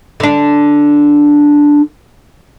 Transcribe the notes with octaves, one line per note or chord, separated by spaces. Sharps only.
D3 D4